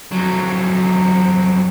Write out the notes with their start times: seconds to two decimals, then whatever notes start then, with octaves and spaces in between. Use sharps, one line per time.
0.12 F2 F#3